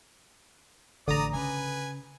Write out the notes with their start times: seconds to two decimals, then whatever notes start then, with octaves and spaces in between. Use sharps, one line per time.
1.08 A1 D3 D5 A#5 D#6
1.33 C#3 B4 G#5